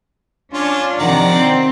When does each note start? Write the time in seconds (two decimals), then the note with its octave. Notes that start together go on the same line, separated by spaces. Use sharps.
0.54 C#4 D4 F4
0.99 C3 D#3 F3 D5 F#5 A#5
1.32 C4